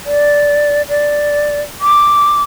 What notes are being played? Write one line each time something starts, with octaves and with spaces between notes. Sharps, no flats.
D5
D5
D6